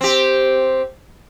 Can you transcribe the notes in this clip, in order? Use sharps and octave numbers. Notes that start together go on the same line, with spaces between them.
C4 G4